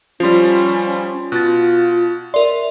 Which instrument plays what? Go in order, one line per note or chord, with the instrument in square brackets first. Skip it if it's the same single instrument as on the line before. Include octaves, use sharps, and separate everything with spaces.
[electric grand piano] F3 G3 [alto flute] C#4 [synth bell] F4 C6
[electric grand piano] B2 [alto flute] F4 [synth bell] F#6 A6
[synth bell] A#4 D5 [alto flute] E5 [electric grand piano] C6